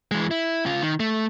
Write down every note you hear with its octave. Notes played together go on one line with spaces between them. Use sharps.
E3 G#3
E4
C#3 F4
D#3
A3